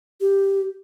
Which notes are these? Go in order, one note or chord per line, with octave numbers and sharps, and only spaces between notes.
G4